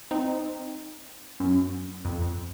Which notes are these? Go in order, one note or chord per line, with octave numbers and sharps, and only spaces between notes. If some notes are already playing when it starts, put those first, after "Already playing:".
C4 D#4
F#2
F2